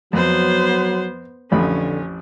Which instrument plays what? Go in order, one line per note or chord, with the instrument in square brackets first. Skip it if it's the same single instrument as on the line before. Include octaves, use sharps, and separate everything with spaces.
[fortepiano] F2 [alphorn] F#3 [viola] B3 C5
[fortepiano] A1 F2 B5 [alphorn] D3 [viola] C#4